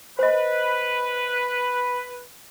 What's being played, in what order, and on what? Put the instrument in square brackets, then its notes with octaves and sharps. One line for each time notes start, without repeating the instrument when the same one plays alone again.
[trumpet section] B4 [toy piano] C5 D#5